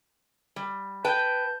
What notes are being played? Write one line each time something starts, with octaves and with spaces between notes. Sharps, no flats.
G3
B4 G5 A5 G6